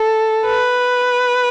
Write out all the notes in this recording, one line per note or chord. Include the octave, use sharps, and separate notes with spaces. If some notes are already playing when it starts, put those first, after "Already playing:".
Already playing: A4
B4